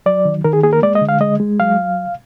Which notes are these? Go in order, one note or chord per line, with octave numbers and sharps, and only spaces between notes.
F#3 D5
D#3
D#3 A#4
G#4
A#3 G#4
A#4
G#3 D5
D#5
D3
F5
G#3 D#5
G#3
F#3 F5